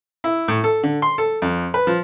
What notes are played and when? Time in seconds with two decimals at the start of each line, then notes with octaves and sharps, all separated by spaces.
0.24 E4
0.48 A2
0.64 A4
0.83 D3
1.02 C6
1.18 A4
1.42 F2
1.74 B4
1.87 F3